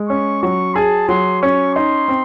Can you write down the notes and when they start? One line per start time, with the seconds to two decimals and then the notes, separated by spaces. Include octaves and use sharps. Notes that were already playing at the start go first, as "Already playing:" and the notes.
Already playing: G#3
0.09 C#4 C#6
0.43 F#3 C#6
0.75 G#4 A5
1.09 F#3 C6
1.42 C#4 C#6
1.75 D#4 C6
2.08 C4